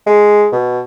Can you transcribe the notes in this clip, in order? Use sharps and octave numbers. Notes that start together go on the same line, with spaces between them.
G#3
B2